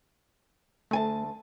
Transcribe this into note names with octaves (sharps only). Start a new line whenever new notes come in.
D2 A3 G#5 A5